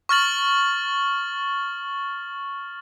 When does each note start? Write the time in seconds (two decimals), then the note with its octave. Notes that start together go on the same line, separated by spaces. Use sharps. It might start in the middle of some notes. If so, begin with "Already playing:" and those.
0.09 C#6 F6 A6 F#7